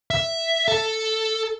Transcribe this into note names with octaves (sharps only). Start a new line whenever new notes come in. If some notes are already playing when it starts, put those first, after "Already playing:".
E5
A4